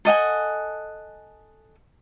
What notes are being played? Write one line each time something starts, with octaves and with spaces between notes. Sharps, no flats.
A4 D#5 F#5 G#5